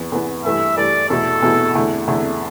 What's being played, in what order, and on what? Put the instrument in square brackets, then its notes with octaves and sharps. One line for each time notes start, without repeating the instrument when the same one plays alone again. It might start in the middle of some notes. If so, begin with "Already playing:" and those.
Already playing: [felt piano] E2 E3 B3
E2 E3 B3
[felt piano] G2 E3 A3 [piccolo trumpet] E5
[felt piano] G2 E3 A3 [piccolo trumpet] D5
[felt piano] E2 B2 A3 E4 [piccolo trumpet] A4
[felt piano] E2 B2 A3 E4
E2 D3 A3 E4
E2 D3 A3 E4